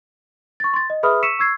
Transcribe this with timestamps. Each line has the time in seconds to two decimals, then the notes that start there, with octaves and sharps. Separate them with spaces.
0.60 C#6 A6
0.74 C6 A6
0.90 D#5
1.03 G#4 B4 E5 B5 D#6 F6
1.22 C#6 E6 B6 C#7 D#7 E7
1.39 C#6 E6 G#6 C7